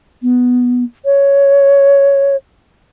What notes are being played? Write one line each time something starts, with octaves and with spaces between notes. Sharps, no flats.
B3
C#5